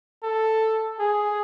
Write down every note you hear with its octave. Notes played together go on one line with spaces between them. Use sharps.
A4
G#4